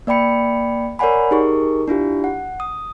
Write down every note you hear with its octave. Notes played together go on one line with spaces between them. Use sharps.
A#3 D5 G5 B5 C#7
A#4 C#5 D5 F#5 G#5 B5
D#4 G4 G#4 A#4 C#6
D4 E4 F4 G4
F#5
D#6